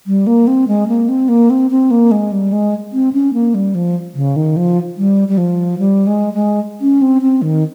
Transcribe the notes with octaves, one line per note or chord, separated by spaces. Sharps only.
G3
A#3
C4
G#3
A#3
C4
A#3
C4
C4
A#3
G#3
G3
G#3
C4
C#4
A#3
G3
F3
C#3
D#3
F3
G3
G3
F3
G3
G#3
G#3
C#4
C4
C4
D#3